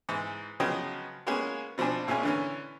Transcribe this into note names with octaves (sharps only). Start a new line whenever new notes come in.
G#2 E3
C#3 F3 F#3 B3 D#5 G5
G#3 A#3 B3 C#4 G#4
B2 F3 C4 D4 G#5
G#1 A#2 G#3 C#4 G#5
D3 E3 C#4